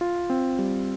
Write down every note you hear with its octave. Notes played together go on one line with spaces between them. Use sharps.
F4
C4
G3